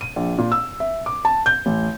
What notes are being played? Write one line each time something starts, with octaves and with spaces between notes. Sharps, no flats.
D#7
A#1
A#2
E6
E5
D6
A5
G6
A1